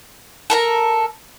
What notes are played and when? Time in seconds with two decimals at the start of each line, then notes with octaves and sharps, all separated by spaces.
0.50 A4 A#4 A#5